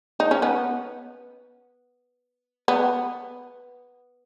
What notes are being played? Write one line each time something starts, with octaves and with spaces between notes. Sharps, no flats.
D#4
C#4
B3
B3